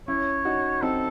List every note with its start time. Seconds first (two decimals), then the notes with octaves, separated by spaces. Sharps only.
0.08 C#4 E4 C#5
0.45 D#4 F#4
0.82 C4 D#4 A4